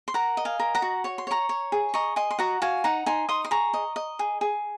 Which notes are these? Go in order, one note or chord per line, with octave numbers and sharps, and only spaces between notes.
C6
A#4 F#5 A#5
D#5
F5 G#5
A#4
F#5 A#5
F#4
C#5 C#6
C6
C#5 A#5 C#6
C#5
G#4
D#5 A#5 C#6
D#5 G#5 C6
C6
F#4 F#5 A#5
F#4 F5 G#5
D#4 F#5 A#5
D#4 G#5 C6
D#4 C6 D#6
C6
G#4 A#5 C#6
D#5
D#5
G#4
G#4